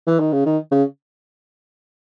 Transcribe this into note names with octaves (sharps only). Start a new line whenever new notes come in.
E3
D#3
C#3
D#3
C#3